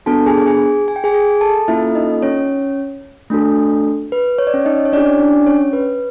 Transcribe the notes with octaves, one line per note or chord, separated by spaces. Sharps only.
B3 D4 F#4 A4 A5
G#4 G#5
G#4 G#5
G#5
G5
G#4 G#5
G#4 G#5
A4 A5
A#3 C#4 E4 F4 A4 E5
D#4 D#5
C#4 C#5
A3 D4 F#4 A4
B4
C#5
D5
C#4 C#5
D#4 D#5
C#5
C#4 D4 E4 G4 D5
D4 D5
C#4 C#5
B4